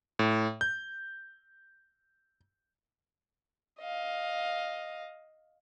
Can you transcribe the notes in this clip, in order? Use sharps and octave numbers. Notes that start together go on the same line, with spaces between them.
A2
G6
D#5 F5